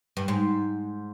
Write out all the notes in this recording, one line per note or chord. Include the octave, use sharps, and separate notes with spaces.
G2
G#2